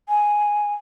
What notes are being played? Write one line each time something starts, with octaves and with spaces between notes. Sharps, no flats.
G#5